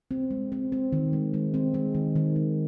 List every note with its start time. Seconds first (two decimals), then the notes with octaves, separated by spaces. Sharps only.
0.11 C4
0.31 G#3
0.52 C4
0.72 C4
0.92 D#3
1.13 G#3
1.34 G#3
1.54 C4
1.74 G#3
1.95 D#3
2.16 D#3
2.36 G#3